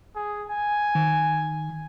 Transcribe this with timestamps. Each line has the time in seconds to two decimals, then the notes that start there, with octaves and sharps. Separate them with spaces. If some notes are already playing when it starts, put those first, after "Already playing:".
0.16 G#4
0.50 G#5
0.95 D#3